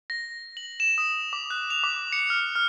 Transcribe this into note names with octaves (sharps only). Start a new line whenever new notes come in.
A#6
F#7
E7
D#6
D6
F#6
F7
D6
C#7
F6
F6